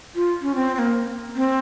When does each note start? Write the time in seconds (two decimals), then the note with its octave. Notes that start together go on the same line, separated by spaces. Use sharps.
0.15 F4
0.42 C#4
0.55 C4
0.75 C4
0.79 A#3
1.36 C4